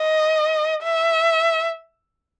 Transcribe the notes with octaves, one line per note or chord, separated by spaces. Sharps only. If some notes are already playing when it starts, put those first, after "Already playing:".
Already playing: D#5
E5